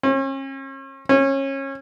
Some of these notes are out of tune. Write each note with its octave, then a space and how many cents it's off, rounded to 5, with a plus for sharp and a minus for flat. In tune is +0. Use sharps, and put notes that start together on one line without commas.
C#4 -40
C#4 -25